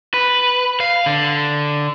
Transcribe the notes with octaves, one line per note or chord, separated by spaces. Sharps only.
B4
F5
D3